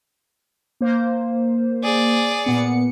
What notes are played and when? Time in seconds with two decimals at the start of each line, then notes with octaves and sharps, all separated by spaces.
0.81 A#3 C5
1.84 G#4 D5
2.44 A#2 B3 C#7